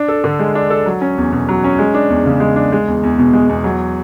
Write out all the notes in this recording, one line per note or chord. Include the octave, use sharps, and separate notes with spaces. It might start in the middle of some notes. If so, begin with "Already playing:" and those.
Already playing: D4
A4
D3
G#3
D4
A4
F#3
C#4
E2
B2
F#3
C#4
G#3
D4
E2
C#3
G#3
D4
G#3
E2
E2
B2
G#3
E2
F#3